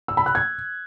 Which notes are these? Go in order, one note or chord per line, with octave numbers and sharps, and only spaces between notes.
E6
B5
F#6
G#6